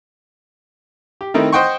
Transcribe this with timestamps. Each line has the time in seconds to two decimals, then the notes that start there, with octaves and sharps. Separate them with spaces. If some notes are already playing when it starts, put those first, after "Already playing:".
1.21 G4
1.34 D#3 A3 C4 D#4 E4
1.52 C5 D#5 F#5 G5 C6 C#6